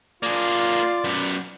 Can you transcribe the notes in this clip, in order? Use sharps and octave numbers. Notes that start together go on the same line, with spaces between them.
A#3 F4 G#4 D5
F#2 B3